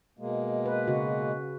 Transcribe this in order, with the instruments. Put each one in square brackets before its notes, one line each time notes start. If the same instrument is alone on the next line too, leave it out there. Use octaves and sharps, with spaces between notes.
[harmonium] B2 G#3 A#3
[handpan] B4
C#3 F#4